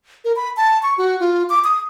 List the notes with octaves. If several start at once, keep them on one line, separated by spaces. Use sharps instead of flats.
A#4
B5
A5
C#6
F#4
F4
D6
D#6